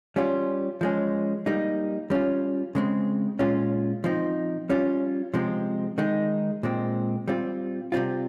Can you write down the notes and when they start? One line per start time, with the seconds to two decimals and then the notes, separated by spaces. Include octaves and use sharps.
0.16 G3 C#4 F4
0.81 F3 G#3 C#4
1.46 G3 A#3 D#4
2.10 G3 C#4 F4
2.75 C#3 G#3 C4
3.39 A#2 G#3 C#4 F4
4.04 F3 C4 D#4
4.69 G3 C#4 F4
5.34 C3 F3 G#3 C4
5.98 D#3 G#3 D#4
6.63 A#2 G#3 C4
7.28 G3 C4 F4
7.92 C3 G3 C4 F4